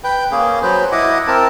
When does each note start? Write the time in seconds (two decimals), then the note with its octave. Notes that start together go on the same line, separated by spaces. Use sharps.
0.04 B4 G5
0.31 A#3 C#4 G#4
0.62 F#3 B4 C5
0.92 E4 D#5 F#5 D6
1.27 C4 A#4 A5